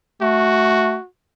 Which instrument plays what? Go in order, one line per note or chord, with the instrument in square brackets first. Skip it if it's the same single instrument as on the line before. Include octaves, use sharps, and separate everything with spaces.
[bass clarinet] A3 [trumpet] F#4